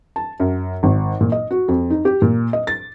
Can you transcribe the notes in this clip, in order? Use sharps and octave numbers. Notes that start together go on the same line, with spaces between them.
A5
F#2
G#1
A#2
D#5
F#4
F2
D#4
G4
A#2
D#5
A6